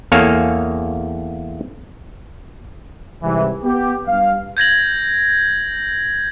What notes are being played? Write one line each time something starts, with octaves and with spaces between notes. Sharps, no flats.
E2 A#3 A4 C#5 F5 G#5
C2 G#2 C3 E3
B3 G4
G2 F5
G6 G#6 A#6 F#7